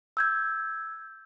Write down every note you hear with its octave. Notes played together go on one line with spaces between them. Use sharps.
E6 G6 G#6